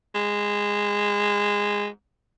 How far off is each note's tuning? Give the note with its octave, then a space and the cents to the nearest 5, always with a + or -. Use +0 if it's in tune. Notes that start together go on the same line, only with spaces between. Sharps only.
G#3 -15